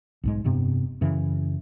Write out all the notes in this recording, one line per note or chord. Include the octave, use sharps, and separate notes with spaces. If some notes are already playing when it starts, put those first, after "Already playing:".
B1 G#2 G#3
F1 G2 C3 B3
F#2 C#3 E3